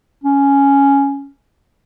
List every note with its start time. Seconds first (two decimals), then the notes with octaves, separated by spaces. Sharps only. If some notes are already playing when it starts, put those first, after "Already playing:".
0.24 C#4